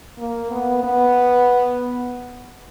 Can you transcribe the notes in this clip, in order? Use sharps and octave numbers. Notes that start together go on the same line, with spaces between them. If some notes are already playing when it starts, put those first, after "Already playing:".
A#3
B3
B3